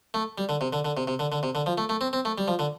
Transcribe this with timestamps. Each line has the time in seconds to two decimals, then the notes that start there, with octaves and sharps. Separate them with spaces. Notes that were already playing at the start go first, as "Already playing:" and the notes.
0.14 A3
0.38 G3
0.49 D3
0.61 C3
0.73 D3
0.85 D3
0.97 C3
1.08 C3
1.19 D3
1.32 D3
1.43 C3
1.55 D3
1.66 F3
1.78 A3
1.89 A3
2.01 C4
2.13 C4
2.25 A3
2.38 G3
2.48 F3
2.59 D3